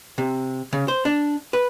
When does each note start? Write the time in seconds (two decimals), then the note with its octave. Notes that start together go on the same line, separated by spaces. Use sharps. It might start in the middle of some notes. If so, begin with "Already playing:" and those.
0.18 C3
0.73 C#3
0.88 C5
1.05 D4
1.53 B4